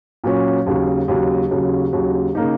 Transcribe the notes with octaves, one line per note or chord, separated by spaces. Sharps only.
A#2 F#3 C#4
D#2 C#3 F#3
D#2 C#3 F#3
D#2 C#3 F#3
D#2 C#3 F#3
C#3 A#3 D#4